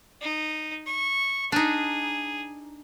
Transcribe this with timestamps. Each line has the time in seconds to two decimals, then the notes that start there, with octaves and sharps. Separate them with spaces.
0.21 D#4
0.86 C#6
1.52 D4 D#4 G#4